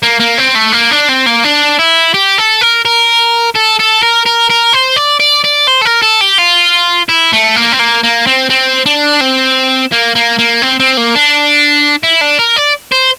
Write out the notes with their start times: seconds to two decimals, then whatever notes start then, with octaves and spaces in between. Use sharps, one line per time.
0.03 A#3
0.20 A#3
0.38 C4
0.55 A3
0.73 A#3
0.91 D4
1.09 C4
1.26 A#3
1.44 D4
1.79 E4
2.14 G4
2.38 A4
2.61 A#4
2.85 A#4
3.56 A4
3.80 A4
4.03 A#4
4.26 A#4
4.50 A#4
4.73 C5
4.96 D5
5.20 D5
5.44 D5
5.68 C5
5.82 A4
5.85 A#4
6.02 A4
6.21 G4
6.39 F4
7.09 E4
7.33 A3
7.56 A#3
7.72 C4
7.79 A#3
8.03 A#3
8.27 C4
8.50 C4
8.86 D4
9.21 C4
9.92 A#3
10.15 A#3
10.39 A#3
10.62 C4
10.80 C4
10.97 A#3
11.15 D4
12.03 E4
12.21 D4
12.39 A#4
12.56 D5
12.92 C5